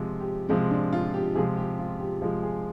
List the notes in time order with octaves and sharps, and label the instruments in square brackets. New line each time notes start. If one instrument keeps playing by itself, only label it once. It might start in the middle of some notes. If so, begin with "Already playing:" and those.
Already playing: [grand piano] C3 F3 G#3 [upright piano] F4
[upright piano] G4
[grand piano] C3 F3 G#3 [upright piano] C4
[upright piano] D4
F4
G4
[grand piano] C3 F3 G#3 [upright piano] G#4
[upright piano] G4
F4
G4
[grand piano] C3 F3 G#3 [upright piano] G4
[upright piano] G#4